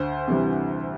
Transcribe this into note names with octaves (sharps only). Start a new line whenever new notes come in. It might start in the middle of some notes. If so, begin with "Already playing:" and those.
Already playing: D2 C5
C3 E3 G3